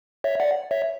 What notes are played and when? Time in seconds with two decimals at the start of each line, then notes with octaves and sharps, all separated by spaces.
0.24 C#5 E5
0.40 D5 F#5
0.71 C#5 E5